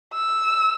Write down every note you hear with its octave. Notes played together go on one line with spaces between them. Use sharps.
E6